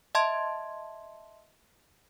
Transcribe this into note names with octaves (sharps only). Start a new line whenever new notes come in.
D#5 E5 A5 C6 G#6